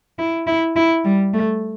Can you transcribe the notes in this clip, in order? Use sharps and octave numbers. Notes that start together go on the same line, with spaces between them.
E4
E4
E4
G3
A3